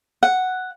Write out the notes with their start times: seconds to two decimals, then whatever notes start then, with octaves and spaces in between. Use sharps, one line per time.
0.23 F#5